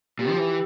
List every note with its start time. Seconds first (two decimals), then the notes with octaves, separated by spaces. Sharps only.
0.19 A#2 G4
0.30 F3
0.38 E3